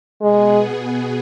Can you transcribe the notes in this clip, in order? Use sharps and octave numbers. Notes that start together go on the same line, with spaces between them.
B2 G#3 B3 G#4